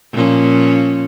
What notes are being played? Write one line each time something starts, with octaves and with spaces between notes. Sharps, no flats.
A#2 F3 C#4